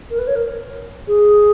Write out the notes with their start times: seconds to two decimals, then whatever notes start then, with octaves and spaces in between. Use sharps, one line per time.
0.10 A#4
0.19 B4
0.27 C#5
0.35 A#4
1.07 G#4